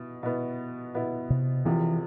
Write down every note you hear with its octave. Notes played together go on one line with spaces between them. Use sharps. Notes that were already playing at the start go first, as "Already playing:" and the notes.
Already playing: B2 E4
B2 B3 E4
B2 B3 E4
C3
E1 E2 C3 E3 F3